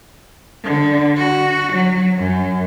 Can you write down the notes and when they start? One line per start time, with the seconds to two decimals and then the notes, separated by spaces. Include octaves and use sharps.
0.64 D3
1.16 F#4
1.72 F#3
2.18 F#2